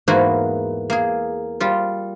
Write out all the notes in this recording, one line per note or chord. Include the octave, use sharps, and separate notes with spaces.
E2 G#2 A#3 E4 F#4
A#3 G#4
G3 F4